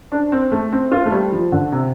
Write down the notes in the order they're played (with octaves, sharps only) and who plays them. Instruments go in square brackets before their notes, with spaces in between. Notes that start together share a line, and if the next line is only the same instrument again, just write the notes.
[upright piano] D4
C4
A3
C4
F4
A3
G3
F3
D3
C3